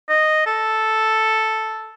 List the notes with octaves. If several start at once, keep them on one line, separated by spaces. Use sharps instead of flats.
D#5
A4